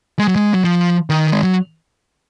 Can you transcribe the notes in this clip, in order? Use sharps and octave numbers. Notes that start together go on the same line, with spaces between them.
G#3
F#3
G#3
F#3
F3
D#3
G#3
F#3